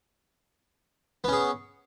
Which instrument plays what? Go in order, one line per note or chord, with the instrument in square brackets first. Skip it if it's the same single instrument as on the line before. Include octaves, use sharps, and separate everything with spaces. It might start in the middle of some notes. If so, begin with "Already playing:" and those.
[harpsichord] B3
C#4
G#4